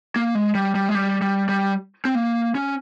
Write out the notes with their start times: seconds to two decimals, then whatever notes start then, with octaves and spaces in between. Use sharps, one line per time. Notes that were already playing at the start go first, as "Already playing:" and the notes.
0.16 A#3
0.35 G#3
0.55 G3
0.75 G3
0.89 G#3
0.95 G3
1.22 G3
1.49 G3
2.05 C4
2.15 A#3
2.55 C#4